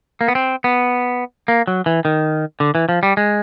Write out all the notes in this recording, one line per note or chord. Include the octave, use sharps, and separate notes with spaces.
A#3
B3
C4
B3
A#3
F#3
E3
D#3
D3
E3
F3
G3
G#3